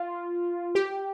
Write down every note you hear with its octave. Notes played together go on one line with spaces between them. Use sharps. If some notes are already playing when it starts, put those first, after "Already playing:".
Already playing: F4
G4